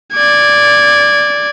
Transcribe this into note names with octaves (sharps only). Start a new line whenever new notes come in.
D5 G#6